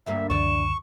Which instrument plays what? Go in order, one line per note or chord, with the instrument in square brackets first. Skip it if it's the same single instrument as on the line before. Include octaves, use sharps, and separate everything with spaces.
[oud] D2 G2 A#3 [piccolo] E5
[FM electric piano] C#2 F#2 D3 [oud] E3 D5 [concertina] C#6 [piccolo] E7